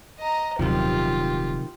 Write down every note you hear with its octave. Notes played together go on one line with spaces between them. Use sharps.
D#5 A#5
D#1 C3 D#3 F3 F#3 F4 G4